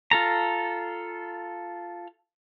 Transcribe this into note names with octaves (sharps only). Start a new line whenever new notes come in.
F4 A4 A#5